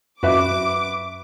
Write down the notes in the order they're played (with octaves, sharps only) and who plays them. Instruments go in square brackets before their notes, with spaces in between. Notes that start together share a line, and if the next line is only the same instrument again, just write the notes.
[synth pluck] F#2 [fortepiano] F#4 B4 E5 [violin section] D6